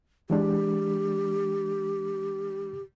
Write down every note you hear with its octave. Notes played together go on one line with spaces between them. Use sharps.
E3 G#3 D4 G4